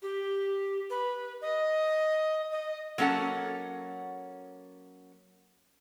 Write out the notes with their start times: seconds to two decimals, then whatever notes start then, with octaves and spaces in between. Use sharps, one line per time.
0.02 G4
0.90 B4
1.42 D#5
2.52 D#5
2.98 F#3 A#3 C#4 A4 F#5